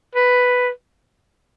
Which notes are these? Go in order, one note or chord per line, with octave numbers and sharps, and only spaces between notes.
B4